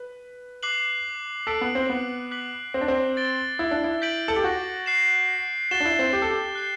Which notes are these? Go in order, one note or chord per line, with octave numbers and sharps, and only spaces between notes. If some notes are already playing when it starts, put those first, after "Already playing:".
Already playing: B4
D6 F#6 C7 F#7
A4 E6 B6 D7
B3
C4
B3
D6 F#6 B6 F#7
C4
D4
C4
A6 D7 G7
E4
D4
E4
G6 B6 D7 F#7
A4
G4
F#4
F#6 C7 E7
F#4 A6 E7 G7
D4
E4
C4
G4
A4
G4
F#6 C7 G7